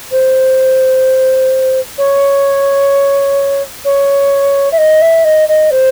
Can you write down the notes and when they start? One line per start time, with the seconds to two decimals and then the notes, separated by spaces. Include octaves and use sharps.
0.11 C5
1.97 C#5
3.84 C#5
4.72 E5
4.78 D#5
5.01 E5
5.24 D#5
5.48 D#5
5.70 C5